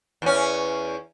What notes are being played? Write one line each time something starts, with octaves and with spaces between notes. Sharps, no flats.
E2 C#4